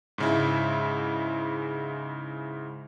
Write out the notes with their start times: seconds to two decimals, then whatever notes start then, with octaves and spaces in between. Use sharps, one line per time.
0.18 G#2 C#3 E4